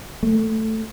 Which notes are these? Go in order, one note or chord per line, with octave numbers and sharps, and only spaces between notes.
A3